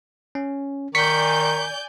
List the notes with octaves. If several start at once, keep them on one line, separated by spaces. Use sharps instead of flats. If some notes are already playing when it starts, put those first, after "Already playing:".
C#4
D#3 D5 G#5 C#6 G6 B6 C#7